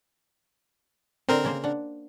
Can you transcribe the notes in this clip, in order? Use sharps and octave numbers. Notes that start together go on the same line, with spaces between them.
D3 C4 A#4 C5 D#5
C#3 A#3 C5
D4 F#5